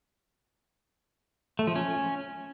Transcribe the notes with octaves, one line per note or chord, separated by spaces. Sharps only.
A3
F3
C#4